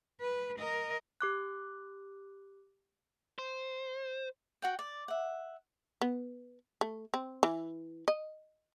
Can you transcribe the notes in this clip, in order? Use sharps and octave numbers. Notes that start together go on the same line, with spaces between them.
B4
A#4 D#5
G4 D6 F#6
C5
F#4 F#5 G5
D5
E5 F#5
B3
A3
C4
E3
D#5